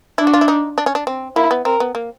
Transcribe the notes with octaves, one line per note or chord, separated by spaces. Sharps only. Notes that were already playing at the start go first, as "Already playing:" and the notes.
D4 E4
F#4
F4
E4
D#4
D4
C#4
D4
C4
A#3 E4
B3
C4 A#4
B3
A#3